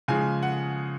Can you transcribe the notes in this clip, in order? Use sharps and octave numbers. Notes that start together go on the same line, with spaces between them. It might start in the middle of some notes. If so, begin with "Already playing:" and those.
C#3 F3 G#3 G#5
F#5